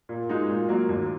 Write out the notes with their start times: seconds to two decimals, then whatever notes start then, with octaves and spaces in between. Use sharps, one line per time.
0.09 A#2
0.29 G#3 D#4 F#4
0.48 A#2
0.69 F#3 A#3 F#4
0.89 D#2